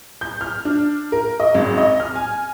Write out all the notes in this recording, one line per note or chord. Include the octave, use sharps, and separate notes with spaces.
G6
F6
D4
A#4
D#5
G#1
D#5
F6
G#5